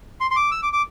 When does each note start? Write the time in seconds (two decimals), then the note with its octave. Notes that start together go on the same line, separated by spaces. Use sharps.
0.21 C6
0.31 C6
0.36 D6
0.51 E6
0.63 D6
0.73 D6